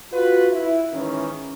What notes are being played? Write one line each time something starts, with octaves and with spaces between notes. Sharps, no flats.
F4 F#4 B4
E4
G#2 D#3 E3 C#4